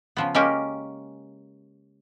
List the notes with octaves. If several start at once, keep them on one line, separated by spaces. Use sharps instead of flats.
C#3 F3 B3
G#3 A#3 C#4 G4 A#4